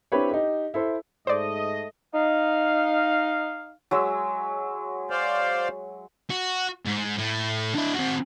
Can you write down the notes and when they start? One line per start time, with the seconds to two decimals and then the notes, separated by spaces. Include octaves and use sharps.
0.12 C4 D4 E4 G4 B4 C#5
0.31 D#4 G4
0.74 E4 A4 C5
1.27 G#2 A3 C5 D5 D#5
2.14 D#4 F5
3.91 F#3 G#3 E5
5.10 C5 D5 F5
6.30 F#4
6.85 G#2
7.18 A2 A3
7.75 D4 E4
7.95 C4 F#4